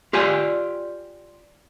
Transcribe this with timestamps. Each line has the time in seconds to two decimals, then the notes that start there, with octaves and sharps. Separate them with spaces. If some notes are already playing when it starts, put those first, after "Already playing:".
0.13 F4 G4 D5 G#5